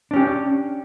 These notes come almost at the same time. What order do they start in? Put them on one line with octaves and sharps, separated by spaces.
D4 C#4 G4